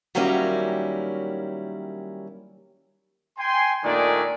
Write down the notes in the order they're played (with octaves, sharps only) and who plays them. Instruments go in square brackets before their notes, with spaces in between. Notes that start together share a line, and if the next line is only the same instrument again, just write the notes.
[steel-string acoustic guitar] D#3 F#3 G3 A#3 C#4 E4
[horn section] G5 G#5 C6
A#2 D#3 A3 D4 D5 G#5